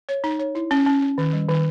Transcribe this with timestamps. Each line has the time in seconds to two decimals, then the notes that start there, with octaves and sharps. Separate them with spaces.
0.09 C#5
0.24 D#4
0.39 C#5
0.55 E4
0.71 C#4
0.86 C#4
1.02 C#4
1.18 D#3
1.33 G3
1.49 D#3